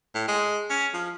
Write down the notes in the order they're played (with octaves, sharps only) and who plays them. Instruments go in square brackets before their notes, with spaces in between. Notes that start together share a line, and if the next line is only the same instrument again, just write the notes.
[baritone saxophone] A2
G#3
C#4
F3